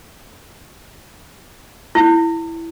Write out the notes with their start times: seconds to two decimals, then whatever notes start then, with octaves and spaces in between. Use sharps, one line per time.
1.95 E4